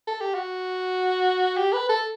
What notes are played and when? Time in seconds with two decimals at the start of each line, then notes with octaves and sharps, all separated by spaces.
0.07 A4
0.21 G4
0.34 F#4
1.57 G4
1.73 B4
1.89 A4